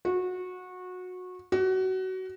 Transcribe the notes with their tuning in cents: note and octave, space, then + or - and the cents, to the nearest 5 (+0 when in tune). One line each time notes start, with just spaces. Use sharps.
F#4 -20
F#4 +25